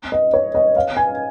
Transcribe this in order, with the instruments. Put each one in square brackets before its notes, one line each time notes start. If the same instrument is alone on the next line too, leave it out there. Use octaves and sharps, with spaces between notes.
[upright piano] D#5
C#5
D#5
F5
G#5